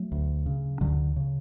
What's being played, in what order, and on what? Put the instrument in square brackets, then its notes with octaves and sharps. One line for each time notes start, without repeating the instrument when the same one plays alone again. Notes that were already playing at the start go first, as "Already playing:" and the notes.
Already playing: [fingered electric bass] F#3 A3
D2
C#3
D2 D3 F#3
C#3